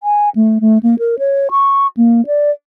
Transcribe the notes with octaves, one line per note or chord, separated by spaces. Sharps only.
G#5
A3
A3
A#3
A#4
C#5
C#6
A#3
D5